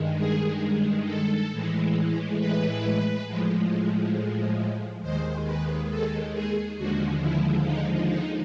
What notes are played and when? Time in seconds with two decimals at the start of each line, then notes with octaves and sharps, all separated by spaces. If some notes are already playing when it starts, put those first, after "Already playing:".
Already playing: G2 D#3 G#3
0.19 G#4
1.07 A4
1.51 A2 E3 G#3
2.39 B4
3.27 A2 F3 G#3
5.02 D#2 D#3 G#3 C5
5.46 B4
5.90 A4
6.34 G#4
6.78 D#2 D3 F3 G#3 F#4
7.22 E4
7.65 D#4
8.10 D#4